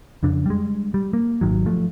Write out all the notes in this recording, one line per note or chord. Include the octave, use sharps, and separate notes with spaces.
F2 C#3 D4
G3 G#3
G3
A#3
G#1 D#3 F#3
F3 A3